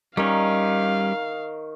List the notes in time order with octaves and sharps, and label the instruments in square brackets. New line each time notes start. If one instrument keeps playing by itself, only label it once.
[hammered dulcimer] D#3 C#6 [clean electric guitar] G3 C#4 [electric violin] F5